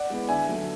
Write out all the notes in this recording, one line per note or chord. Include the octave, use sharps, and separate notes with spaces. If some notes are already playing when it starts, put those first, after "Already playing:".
Already playing: D5 F#5
G#3 B3 E4
D3 E5 G#5
F#3 A3